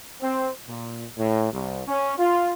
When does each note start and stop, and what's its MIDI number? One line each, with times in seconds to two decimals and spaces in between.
0.21 0.49 60
0.66 1.04 46
1.16 1.51 45
1.52 1.82 36
1.86 2.14 61
2.18 2.52 65